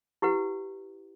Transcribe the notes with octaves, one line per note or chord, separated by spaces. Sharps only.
E4 G4 B4 F#5